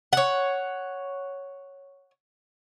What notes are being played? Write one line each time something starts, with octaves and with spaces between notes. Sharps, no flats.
C#5 F#5